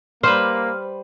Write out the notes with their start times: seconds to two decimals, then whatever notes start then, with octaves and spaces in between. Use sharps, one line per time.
0.23 G3 A#3 B4 C5 F6